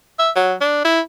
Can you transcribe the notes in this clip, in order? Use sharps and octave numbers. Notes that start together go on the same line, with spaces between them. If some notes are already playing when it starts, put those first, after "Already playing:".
E5
F#3
D4
E4